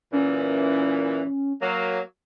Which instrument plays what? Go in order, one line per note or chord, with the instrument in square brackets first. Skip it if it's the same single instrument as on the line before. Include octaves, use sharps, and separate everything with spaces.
[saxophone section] F#2 A#2 E3 [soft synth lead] C#4
[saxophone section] F#3 A#3